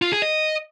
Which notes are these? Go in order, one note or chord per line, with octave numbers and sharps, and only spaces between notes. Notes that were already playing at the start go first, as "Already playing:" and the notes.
F4
G#4
D#5